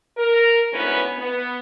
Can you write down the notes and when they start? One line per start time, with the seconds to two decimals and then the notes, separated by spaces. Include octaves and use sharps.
0.17 A#4
0.73 D2 G#2 B3 C#4 E4 B4
1.18 B3